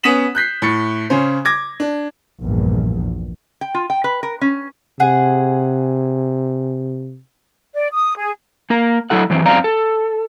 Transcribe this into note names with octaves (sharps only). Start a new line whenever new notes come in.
B3 C#4 D#6 B6 E7 F#7
F#6 G6 B6 C7
A2 A6 C#7
C#3 C#4 C5
D6 G#6 A#6
D4
A#1 E2 G2
G5
F4
G5
B4
A#4
C#4
C3 G#4 F#5
D5
D#6
G#4
A#3 A#4
F#3 E4 A4 F#5
F#2 E3 C4
F#2 C4 D5 F5 A#5
A4